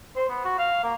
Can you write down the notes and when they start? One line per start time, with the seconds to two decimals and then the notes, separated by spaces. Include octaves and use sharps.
0.16 C5
0.29 B3
0.45 F#4
0.58 F5
0.83 A#3